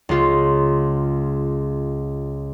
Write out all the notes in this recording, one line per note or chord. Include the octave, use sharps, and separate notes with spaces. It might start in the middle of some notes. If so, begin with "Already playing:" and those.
C#2 F4